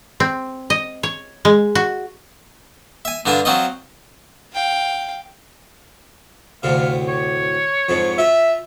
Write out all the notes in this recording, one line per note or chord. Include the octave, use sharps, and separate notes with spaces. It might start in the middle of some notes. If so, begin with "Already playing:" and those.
C4
D#5
C#5
G#3
F#4
E5 G#5
G2 D3 D4 F4 G#5
F#3 C4 F4 D#5
F5 G5
D2 A2 C3 F5
C#5
F2 G#2 F3
F4 E5